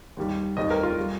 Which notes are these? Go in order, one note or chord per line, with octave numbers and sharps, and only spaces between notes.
D#2 D#3 G3
F1 D#2 D#3 G3 D#5
A#4
F4
G3